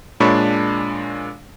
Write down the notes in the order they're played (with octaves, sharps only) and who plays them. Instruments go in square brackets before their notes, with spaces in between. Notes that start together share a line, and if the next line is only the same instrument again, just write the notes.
[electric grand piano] A#2 G#3 D4 C#5 B5 C#6